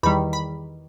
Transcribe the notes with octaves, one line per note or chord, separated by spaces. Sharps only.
E2 D#3 G3 B5
B5